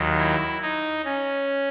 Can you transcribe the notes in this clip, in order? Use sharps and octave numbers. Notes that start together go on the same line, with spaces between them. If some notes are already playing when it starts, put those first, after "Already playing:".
Already playing: D#2 D#3 F#3
E4
D#4
C#4